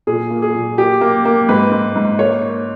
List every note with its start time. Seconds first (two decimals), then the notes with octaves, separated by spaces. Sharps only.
0.07 A#2 G#4
0.30 A#3
0.42 G#4
0.55 A#2
0.78 A#3 G4
1.01 A#3
1.25 A#3
1.49 G#2 B4
1.72 G#2
1.95 G#2
2.19 A#3 C#5
2.42 A#3